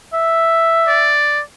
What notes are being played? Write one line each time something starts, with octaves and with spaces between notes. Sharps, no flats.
E5
D5